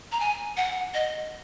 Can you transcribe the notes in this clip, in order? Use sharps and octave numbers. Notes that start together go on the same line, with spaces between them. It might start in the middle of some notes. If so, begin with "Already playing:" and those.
A#5
G#5
F#5
D#5